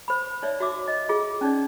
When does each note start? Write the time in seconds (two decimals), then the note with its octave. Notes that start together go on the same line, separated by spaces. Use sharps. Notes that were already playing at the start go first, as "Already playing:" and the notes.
0.08 C5 B5
0.42 D#4 C#5 D5 E5
0.60 F#4 E5 D6
0.88 D#5
1.09 F4 G#4
1.41 C#4 D#4 D5